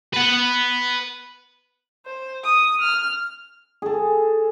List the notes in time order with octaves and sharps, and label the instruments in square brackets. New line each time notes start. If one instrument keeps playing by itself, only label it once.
[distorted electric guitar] B4 F#5
[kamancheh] C5
D#6
F6
[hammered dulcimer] G#4 A4